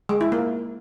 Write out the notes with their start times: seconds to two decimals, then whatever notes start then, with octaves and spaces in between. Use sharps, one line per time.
0.09 G#3
0.21 E4
0.32 A#3